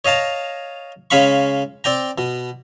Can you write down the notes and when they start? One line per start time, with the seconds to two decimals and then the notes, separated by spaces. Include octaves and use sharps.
0.05 C#5 D#5 F5 A5 A#5
1.10 C#3 G#3 C#4 F5 B5 C#6
1.84 C4 D5 G5 A#5
2.18 B2